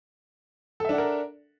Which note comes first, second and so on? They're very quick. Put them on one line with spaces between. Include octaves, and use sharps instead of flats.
A4 E5 D4 F#5 A#4